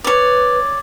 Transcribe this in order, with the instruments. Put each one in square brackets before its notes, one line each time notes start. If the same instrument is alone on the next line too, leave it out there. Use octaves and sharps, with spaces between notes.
[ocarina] B4 [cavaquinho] C#5 D5